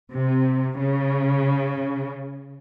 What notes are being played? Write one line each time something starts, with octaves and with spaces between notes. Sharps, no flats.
C3
C#3